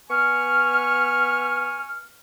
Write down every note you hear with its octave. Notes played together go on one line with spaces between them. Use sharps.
B3 G#5 C#6 F6